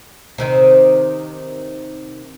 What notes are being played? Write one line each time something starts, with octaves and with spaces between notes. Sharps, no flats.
C3 D#3 C4